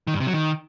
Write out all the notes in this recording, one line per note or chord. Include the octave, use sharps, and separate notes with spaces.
D#3
G2
C3
F#3
D#3